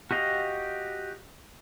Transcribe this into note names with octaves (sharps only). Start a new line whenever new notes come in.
F#4 G4 D#5 F5